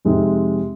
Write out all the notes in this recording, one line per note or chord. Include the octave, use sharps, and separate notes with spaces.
F2 C3 G#3 C4 D#4